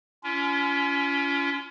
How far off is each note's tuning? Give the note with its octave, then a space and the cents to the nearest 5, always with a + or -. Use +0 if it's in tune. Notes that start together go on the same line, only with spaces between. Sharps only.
C#4 +30 F4 -35